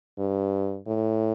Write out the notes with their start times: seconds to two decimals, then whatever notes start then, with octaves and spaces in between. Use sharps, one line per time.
0.19 G2
0.87 A2